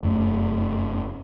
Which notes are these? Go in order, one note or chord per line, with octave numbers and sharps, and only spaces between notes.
F1 F#2 A3